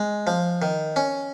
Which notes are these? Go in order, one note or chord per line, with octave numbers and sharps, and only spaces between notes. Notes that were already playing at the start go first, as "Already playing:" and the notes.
Already playing: G#3
F3
D#3
C#4